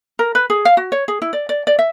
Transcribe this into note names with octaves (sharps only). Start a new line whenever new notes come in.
A#4
B4
G#4
F5
F#4
C#5
G#4
E4
D5
D5
D5
E5